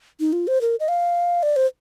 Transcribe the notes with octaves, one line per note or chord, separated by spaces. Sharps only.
D#4
F4
C5
A#4
D#5
F5
D5
C5